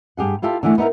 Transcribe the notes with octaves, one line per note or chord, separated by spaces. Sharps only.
G2 G4 G#4 F#5
E4 F4 G4 A4
D3 E3 A3
B3 D#4 E4 A#4